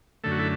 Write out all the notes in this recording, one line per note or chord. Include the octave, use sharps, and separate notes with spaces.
F#2 D3 A3 A4
F#4
E4 A4